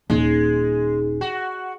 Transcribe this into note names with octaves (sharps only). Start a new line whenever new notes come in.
D#1 G#3 D#4
F#4